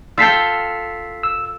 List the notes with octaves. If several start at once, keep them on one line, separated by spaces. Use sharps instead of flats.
F4 A4 G5 E6 B6 C7
E6